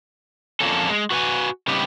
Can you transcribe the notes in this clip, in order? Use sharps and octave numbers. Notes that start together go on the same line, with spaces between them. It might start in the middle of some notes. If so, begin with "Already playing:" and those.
F2 D3 F3 A#3 C#4 A4
G#3
F#4 B4 G5 G#5
C#3 G3 C4 D#4 G4 B4